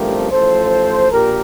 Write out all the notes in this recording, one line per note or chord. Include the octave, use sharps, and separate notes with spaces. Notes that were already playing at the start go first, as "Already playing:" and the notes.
Already playing: A1 G2 F3 A3 C4 G4 A#4
A1 A2 F3 A4 C5
A#1 A#2 G4 A#4